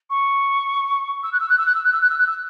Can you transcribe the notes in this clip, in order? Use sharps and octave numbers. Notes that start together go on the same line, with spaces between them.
C#6
E6
F#6
E6
F#6
E6
F#6
E6
F#6
E6
F#6
E6
F#6
E6